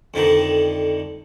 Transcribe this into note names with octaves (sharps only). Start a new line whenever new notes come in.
F2 D3 D#3